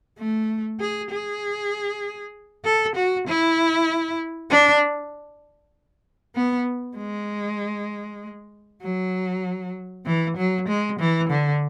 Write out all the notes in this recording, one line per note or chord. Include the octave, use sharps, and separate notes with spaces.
A3
G#4
G#4
A4
F#4
E4
D4
B3
G#3
F#3
E3
F#3
G#3
E3
D3